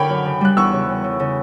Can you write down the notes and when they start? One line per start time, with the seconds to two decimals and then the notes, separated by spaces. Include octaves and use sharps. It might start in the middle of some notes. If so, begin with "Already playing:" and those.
Already playing: D3 G4 A#4 C#5 G5 B5
0.09 F#2
0.25 C#3
0.41 G3 F#6
0.57 E2 C#6 E6
0.72 C#3
0.89 C#3
1.04 C#3
1.20 C#3